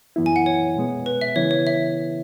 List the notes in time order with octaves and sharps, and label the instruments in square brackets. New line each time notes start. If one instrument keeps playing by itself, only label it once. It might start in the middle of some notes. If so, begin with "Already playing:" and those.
[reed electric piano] F#2 E3 B3 E4
[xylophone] G#5
F#5
C#5
[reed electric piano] B2 G#3 B3
[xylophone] B4
E5
[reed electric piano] C#3 E3 B3 E4 [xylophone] C#5
[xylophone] C#5
E5